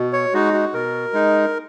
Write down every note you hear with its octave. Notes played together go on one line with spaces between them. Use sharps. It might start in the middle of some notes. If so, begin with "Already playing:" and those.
Already playing: B2
C#5
G#3 D#4 F#4
F#4
B2 A#4
G#3 D#4